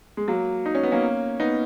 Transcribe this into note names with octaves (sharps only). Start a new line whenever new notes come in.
G#3
F#3 A#3
D#4
C#4
B3
A#3 C#4
B3 D#4